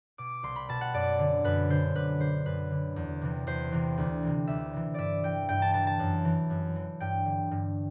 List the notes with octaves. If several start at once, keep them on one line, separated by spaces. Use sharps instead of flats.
B2 D6
C2 C6
B5
B2 A5
F#5
F#2 D5
D3
F#2 B4
D3 C5
F#2 B4
D3 C5
F#2 B4
D3
E2
C3 E3
E2 C5
C3 E3
D2
C3 E3
D2 E5
C3 E3
G2 D5 E5
E3 G5
G2 G5
A5
E3 A5
A5
F#2
E3
F#2
E3
G2 G5
D3
G2